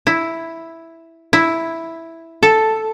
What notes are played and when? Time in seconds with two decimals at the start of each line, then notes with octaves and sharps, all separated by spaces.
0.07 E4
1.33 E4
2.43 A4